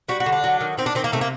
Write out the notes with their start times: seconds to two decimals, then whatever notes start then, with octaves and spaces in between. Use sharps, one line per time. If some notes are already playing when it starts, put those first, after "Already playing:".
0.09 G3 F#4
0.20 F#4
0.26 D3
0.32 D4
0.44 F#3
0.61 D#3
0.78 D#3 C4
0.86 D4
0.95 D#3 C4
1.04 A#3
1.12 C3 A3
1.21 A#3